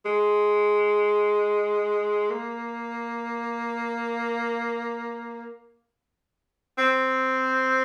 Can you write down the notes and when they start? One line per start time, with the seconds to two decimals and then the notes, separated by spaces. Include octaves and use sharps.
0.05 G#3
2.30 A#3
6.78 C4